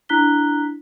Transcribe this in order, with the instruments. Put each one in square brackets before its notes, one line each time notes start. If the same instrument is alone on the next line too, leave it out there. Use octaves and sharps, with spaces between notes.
[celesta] D4 E4 A#5 F#6 B6 G7